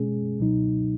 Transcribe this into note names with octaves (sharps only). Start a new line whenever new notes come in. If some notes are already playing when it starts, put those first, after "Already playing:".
Already playing: B2 G#3 C#4 G#4
C#2 B2 F#3 D#4